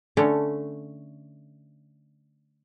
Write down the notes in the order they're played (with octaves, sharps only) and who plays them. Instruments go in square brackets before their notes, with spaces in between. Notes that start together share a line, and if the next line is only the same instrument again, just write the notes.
[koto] D3 A3 C#4